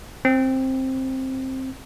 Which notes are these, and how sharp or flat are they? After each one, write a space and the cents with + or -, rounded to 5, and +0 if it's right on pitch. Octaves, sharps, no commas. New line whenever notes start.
C4 +10